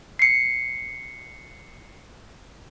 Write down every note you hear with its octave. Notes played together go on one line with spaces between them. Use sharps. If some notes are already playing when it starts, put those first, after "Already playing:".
C7 C#7